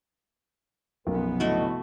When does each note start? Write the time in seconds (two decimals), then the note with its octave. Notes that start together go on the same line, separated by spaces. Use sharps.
1.07 B1 F#2 C3 F3 B3 A#4
1.40 A2 D3 E3 A3 F#4 D#5